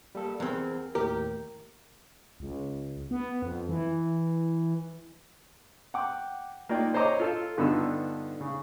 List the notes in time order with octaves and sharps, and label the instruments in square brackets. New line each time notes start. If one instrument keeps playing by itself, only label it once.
[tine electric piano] G3 A#3 A4
[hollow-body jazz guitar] E2 C4 [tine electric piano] A#4
[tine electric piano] D#2 A2 [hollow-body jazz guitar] G4 [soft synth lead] A#4
[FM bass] C#2
B3
F2
E3
[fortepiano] F#5 G5 D6
A#3 D#4 F4 D5 G5
C5 C#5 D#5 A#5 D6
F4 A4 F5
G2 D3 B3 D#4 F4 E6
C#3